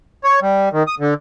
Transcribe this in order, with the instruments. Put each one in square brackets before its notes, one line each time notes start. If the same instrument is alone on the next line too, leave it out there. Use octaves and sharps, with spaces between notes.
[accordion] C#5
G3
D#3
D#6
D3